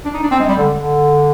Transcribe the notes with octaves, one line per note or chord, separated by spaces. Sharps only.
D4
D#4
D4
C4
G#3
G3
D3
D3